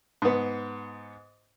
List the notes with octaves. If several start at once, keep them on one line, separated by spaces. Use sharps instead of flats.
G#2 B3